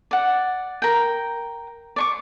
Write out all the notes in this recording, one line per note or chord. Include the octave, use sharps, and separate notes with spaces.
D5 F#5
A#4 G5
D5 C#6 D6